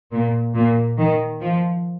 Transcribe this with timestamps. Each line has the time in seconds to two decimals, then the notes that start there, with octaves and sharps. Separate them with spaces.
0.12 A#2
0.55 A#2
0.98 D#3
1.41 F3